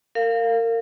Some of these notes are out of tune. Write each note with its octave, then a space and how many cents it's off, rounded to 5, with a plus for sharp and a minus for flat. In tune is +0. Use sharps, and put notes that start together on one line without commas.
A#4 -30 F5 +0